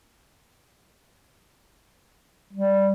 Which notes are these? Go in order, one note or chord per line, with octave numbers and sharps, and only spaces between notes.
G3